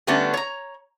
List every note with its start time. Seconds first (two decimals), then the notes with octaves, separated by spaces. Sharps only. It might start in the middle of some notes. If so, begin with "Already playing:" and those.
0.07 D3 G3 A3 B3 C#4 D4
0.34 C#5 A#5